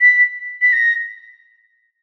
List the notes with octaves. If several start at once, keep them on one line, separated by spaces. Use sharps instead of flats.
B6
B6
A#6